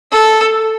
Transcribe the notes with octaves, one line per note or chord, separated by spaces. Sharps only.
A4